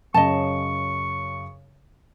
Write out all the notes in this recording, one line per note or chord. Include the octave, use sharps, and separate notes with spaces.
F#2 C#3 D#5 A5 C#6